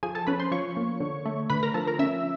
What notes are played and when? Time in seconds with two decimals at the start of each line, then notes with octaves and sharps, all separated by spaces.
0.03 F3 G#4 G#5
0.15 A4 A5
0.27 C#4 B4 B5
0.40 C5 C6
0.51 F3 C#5 C#6
0.77 A#3
1.00 D3
1.25 A3
1.50 D3 B4 B5
1.63 A#4 A#5
1.74 F3 A4 A5
1.87 A#4 A#5
1.99 C#4 E5 E6